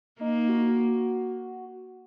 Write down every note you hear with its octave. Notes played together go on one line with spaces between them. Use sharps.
A#3 D#4
F#4